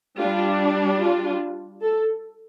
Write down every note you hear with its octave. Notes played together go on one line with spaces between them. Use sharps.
G3 D4 F4
F4
A4